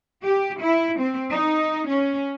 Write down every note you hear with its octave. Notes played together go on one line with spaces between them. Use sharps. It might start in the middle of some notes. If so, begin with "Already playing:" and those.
G4
E4
C4
D#4
C#4